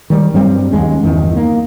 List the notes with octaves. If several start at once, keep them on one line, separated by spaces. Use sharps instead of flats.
D#3 G3
G2 F#3 G3 C4
D#2 G#3 C#4
G1 E2 D#3
A#3